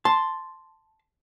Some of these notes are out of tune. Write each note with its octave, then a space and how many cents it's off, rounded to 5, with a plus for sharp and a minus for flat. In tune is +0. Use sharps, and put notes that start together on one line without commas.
A5 +0 C6 +0